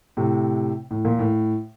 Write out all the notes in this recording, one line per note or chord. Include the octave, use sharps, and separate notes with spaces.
A2 C3
A2
A#2
A2